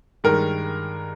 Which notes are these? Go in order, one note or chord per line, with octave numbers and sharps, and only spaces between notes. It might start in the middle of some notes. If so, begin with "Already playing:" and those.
G2 D#3 G#3 A#4